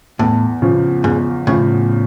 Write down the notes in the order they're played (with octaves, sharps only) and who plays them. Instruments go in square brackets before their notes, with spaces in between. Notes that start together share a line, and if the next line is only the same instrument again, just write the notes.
[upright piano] E2 [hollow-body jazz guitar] A2
[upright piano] C#3 F3
[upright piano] E2 [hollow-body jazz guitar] G#2
[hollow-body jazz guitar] A2 [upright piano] C#3 F3